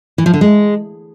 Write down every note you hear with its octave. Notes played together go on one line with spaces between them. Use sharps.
E3
F3
D3
G#3